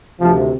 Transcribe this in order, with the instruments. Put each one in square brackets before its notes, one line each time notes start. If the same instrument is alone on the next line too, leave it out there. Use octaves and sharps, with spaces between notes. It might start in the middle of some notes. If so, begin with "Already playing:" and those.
[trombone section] D2 C3 D#3 F3